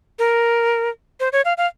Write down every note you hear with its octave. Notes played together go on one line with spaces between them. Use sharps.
A#4
C5
C#5
F5
F5